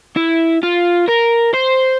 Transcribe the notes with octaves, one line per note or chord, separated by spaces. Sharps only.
E4
F4
A#4
C5